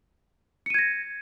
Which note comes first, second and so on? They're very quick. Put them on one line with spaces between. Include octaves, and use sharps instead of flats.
C#7 D#7 G#6 A#6